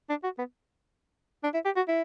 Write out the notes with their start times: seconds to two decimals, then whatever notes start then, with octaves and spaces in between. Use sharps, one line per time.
0.09 D4
0.23 F#4
0.38 B3
1.43 D4
1.54 E4
1.65 G4
1.76 F#4
1.88 E4